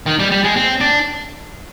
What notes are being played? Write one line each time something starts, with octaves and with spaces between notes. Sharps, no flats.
D#3
G3
G3
G#3
C4
D4